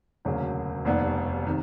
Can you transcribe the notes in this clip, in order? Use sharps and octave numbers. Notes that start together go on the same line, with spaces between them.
E1 D2 C#3 F#3 A#3
F1 D#2 D#3 G3 B3
C3 D#3